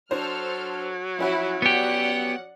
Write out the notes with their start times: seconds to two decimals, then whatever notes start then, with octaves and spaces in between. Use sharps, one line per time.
0.11 F#3 D4 A4 C5 F6
1.19 F3 C#4 E4 F#4
1.62 B3 G4 D5 F#5